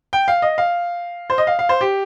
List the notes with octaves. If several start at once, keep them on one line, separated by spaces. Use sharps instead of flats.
G5
F5
D#5
F5
C5
D#5
F5
F5
C5
G4